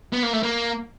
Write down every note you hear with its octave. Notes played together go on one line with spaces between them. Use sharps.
B3
A#3
A3
A#3